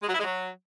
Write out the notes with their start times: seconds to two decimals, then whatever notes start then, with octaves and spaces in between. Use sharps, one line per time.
0.02 G#3
0.08 F#3
0.13 E4
0.19 G#3
0.24 F#3